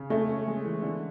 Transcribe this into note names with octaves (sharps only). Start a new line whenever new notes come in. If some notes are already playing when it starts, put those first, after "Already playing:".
Already playing: C#3
A3 C#4
C#4
G#3
E3
D3